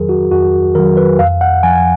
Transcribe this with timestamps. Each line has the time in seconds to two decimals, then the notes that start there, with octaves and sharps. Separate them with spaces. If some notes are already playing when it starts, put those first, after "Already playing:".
Already playing: F2 D#3 F#3 G#4 A#4
0.09 F#4
0.31 F2 F#4
0.75 D#3 F#3 A#4
0.97 B4
1.19 F2 F5
1.41 F#5
1.63 F3 G#5